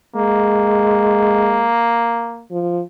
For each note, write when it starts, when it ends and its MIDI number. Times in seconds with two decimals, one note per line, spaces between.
0.16 1.70 56
0.16 2.45 58
2.51 2.81 53